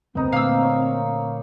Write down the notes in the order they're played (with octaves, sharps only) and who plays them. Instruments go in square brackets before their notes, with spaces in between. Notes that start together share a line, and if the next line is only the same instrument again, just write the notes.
[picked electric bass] F1 D2 G2 [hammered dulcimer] B3 D#4 A#4 [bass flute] C4
[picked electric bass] A#2 D3 A3 [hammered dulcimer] A#3 [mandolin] F5 E6
[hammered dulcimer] C#5